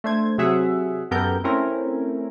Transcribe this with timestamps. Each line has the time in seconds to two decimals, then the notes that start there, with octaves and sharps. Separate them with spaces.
0.04 A3 D4 C5 G#6
0.38 C3 F#3 G#4 E5 F#5
1.11 F#2 B3 G4 A4 A#4 G6
1.44 A3 C4 C#4 E4 A#4